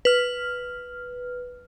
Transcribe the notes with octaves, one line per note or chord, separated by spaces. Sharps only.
B4 F6